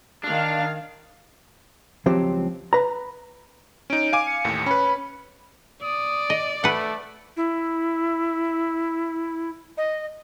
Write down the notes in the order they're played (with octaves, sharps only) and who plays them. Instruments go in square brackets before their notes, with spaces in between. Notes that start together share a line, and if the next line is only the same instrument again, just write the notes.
[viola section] D#3 F5 [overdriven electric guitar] D4
[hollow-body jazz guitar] C#2 F3 F#3 C4 G4
B4 A#5
[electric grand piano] C#4 D#4 [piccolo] D7
[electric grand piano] F5 G#5 D6
[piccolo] C#7
[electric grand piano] A1 D#2 A2
[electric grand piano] C#4 B4 [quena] B5
[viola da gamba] D5 [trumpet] D#6
[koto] D#5
[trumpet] A3 [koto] B4 F#5
[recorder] E4
D#5